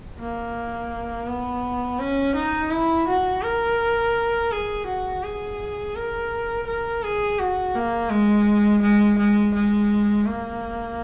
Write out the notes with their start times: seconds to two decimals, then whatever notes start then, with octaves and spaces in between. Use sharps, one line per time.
0.19 A#3
1.27 B3
1.99 C#4
2.36 D#4
2.71 E4
3.08 F#4
3.43 A#4
4.52 G#4
4.87 F#4
5.23 G#4
5.95 A#4
6.67 A#4
7.03 G#4
7.39 F#4
7.75 A#3
8.10 G#3
8.82 G#3
9.18 G#3
9.55 G#3
10.26 A#3